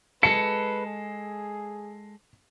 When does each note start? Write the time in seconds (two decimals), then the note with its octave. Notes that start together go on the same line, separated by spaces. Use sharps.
0.23 G#3 A4 B4 C#7
0.86 G#4